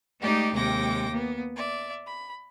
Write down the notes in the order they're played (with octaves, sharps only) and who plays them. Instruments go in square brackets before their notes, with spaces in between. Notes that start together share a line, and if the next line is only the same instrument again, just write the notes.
[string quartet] G#3 A3 D#4 G4 D5
D#2 C3 G#3 G5 D6 A#6
A#3 B3
D5 E5
B5